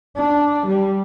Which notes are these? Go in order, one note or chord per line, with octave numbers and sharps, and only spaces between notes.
D4
G3